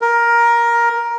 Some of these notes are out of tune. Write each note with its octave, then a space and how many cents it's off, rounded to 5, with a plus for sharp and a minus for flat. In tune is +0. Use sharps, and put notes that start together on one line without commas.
A#4 +10